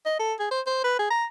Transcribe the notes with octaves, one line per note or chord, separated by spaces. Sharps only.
D#5
A4
G#4
C5
C5
B4
G#4
A#5